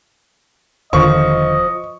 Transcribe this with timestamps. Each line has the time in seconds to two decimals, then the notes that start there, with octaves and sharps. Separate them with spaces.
0.93 E1 D3 D#3 F3 D#5 C#6